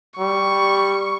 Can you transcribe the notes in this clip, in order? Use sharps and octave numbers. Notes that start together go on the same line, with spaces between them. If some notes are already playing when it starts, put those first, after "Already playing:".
G3 C#6